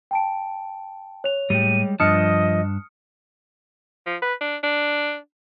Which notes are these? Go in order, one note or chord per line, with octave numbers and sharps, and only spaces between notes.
G5 A5 D7
C#5 F7
A2 G3 G#3 G4 D#7
G2 F3 D4 D#5 A5 D#6 F6 C#7
F3
B4
D4
D4